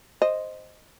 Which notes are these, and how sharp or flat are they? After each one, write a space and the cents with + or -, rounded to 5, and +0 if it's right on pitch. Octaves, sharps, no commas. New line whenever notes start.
C5 +0 D#5 +0